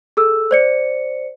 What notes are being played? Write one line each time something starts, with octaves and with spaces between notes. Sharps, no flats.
G#4 A4 E6
C5 D5 C#7